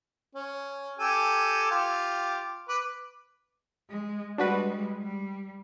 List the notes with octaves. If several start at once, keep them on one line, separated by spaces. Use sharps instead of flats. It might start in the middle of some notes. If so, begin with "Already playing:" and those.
C#4
G4 A4 G#5
F4 G4
B4 D6
G#3
G3 G#3 D4 F#4 B4
G3